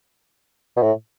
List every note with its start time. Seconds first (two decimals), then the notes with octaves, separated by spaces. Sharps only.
0.77 B2
0.83 A2